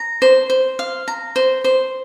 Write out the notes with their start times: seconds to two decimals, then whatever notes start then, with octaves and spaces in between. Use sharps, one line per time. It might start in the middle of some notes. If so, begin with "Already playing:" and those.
Already playing: A#5
0.22 C5
0.50 C5
0.79 F5
1.08 A#5
1.36 C5
1.64 C5